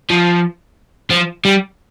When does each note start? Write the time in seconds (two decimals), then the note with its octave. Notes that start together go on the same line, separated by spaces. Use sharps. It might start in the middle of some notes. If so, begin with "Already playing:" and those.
0.10 F3
1.11 F3
1.45 G3